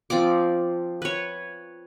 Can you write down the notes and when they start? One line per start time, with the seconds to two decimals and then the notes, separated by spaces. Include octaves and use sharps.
0.10 F3 C4 D5 D6
1.02 B4 C#5